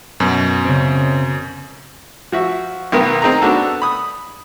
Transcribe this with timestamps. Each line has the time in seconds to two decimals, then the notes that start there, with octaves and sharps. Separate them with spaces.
0.20 F#2 B2
0.65 C#3 C4
2.32 F3 F#4 E5
2.92 B1 D#3 B3 A#4 D#6
3.22 C4 D#4 G#4 A#5
3.42 B3 D4 F#4 A4
3.82 B5 D#6